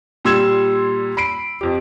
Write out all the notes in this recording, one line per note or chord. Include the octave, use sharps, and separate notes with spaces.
A#2 G3 C6 E6 G#6 E7
B5 C7 D7
F2 G4